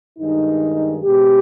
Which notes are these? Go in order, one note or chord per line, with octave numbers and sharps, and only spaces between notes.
G2 D#3 G#3 D#4
B2 G#3 G4